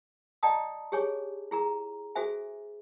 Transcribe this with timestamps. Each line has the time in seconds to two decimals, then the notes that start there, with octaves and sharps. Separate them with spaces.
0.43 D5 D#5 G5 A5 A#5 D#6
0.92 G4 G#4 C#5 G#5 D6
1.51 E4 G#4 A#5
2.15 F#4 G#4 A4 C5 E5 G#5